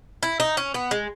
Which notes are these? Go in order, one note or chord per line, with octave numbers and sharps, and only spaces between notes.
E4
D#4
C#4
B3
G#3